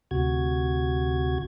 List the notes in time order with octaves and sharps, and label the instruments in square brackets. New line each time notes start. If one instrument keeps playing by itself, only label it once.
[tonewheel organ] D2 C3 F#4 G#6